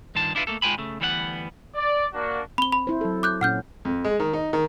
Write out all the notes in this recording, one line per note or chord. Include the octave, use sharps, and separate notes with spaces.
G2 D#3 F4 A5
D4 E4 F4 A4 B4
A3 A#3 A4
G#2 G#3 F4 G5 G#5 B5
C#3 A3
D2 E3 G3 B3 C#5 F#5
D5
A#3 D4 F#4
C4 B5 G7
B5
E4 C5
F#3 A4
D6 F#6 G6
A#2 C#4 F#5 F6 G6
F2
G#3
D#3
D#4
D#3